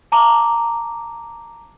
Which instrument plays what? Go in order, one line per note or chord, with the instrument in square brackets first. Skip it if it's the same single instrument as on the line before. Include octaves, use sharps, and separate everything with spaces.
[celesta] A5 A#5 D6